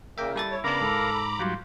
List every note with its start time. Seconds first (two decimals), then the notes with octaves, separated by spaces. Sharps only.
0.18 A#2 C#3 A#3 A#4 E5 G5
0.36 G3 E4 A4 A6
0.51 C#5
0.64 C#3 B3 D4 A#4 F5 A#5 B5 D6
0.81 G#2 A4
1.40 F#3 G3 F4